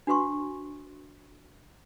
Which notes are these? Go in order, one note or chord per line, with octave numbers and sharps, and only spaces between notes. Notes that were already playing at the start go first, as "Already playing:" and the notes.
D4 F#4 B4 C6 C#6